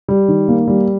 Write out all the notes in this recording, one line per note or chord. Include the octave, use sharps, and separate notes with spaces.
G3
D#3
A#3
G3